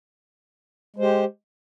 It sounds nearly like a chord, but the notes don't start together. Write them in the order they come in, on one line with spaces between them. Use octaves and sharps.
G#3 C5 G4